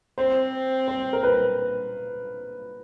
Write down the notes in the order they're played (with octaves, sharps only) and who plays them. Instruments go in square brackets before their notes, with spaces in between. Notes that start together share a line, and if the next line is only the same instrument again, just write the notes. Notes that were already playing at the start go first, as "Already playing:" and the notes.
[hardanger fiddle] C4 [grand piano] C5
[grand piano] C5
A#4
B4